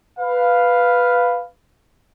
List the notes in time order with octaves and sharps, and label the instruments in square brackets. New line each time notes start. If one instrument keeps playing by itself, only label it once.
[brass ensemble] B4 F5